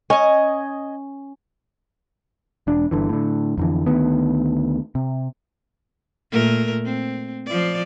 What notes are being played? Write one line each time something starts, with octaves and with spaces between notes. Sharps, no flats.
C#4 D#5 G#5
E1 D4
G1 D3 E3
A2 D3
F2 D3 E3
D2 D#3 B3
C3
A#2 A3 A#4
C4
F3 D5